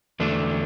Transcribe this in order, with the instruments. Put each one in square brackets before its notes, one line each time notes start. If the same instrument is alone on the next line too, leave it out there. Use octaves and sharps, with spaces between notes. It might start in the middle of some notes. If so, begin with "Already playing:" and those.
[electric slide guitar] E2 D3 A3 D4